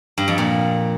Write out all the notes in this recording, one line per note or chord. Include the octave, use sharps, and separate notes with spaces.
G2
F2
A#2